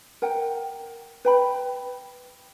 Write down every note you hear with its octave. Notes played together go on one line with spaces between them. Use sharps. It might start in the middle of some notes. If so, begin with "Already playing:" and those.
A#4 F#5 G5
B4 G5 B5